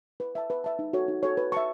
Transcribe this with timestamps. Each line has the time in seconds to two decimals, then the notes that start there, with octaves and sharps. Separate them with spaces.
0.20 B4
0.35 E5 A5
0.50 B4
0.64 E5 A5
0.79 D#4
0.93 F#4 A4 C#5
1.08 D#4
1.23 F#4 A4 C#5
1.37 B4
1.52 E5 A5 C#6